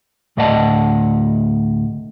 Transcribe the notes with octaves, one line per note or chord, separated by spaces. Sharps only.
D2 A2 D5 D#5 F#5 A5